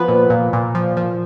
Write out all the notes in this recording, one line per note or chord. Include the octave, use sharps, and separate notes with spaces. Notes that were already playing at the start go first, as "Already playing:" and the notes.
Already playing: F3 B3 B4
A#2
A#2
A#2
F3
F3